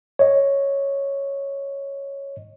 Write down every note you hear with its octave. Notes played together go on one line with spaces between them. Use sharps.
C#5 D#5